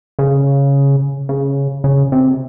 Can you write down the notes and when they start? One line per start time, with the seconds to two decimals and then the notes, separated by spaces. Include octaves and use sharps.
0.19 C#3
1.29 C#3
1.84 C#3
2.12 C3